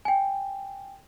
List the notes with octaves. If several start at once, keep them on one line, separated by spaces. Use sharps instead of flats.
G5 G#5